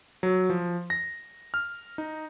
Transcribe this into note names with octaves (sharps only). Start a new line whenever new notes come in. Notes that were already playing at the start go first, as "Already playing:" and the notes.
F#3
F3
A#6
F6
D#4